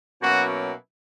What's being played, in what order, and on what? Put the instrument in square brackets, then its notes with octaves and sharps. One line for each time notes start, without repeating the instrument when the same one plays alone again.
[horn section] B2 F#3 A#3 C#4 E4 F#4